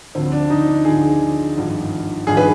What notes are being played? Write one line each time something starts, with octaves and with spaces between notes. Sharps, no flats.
D2 D3 F3 C4
D4
D#4
D2 D3 F3 G#4
G#1 G2 F3
G#1 G2 F3 G#4
B4